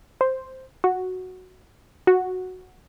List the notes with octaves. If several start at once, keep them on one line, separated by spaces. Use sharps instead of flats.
C5
F#4
F#4